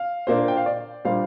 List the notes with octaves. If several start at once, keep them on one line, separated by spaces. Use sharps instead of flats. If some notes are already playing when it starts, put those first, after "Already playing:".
Already playing: F5
A#2 A#3 D4 C5
G5
F5
D5
A#2 G3 A#3 D4 C5 F5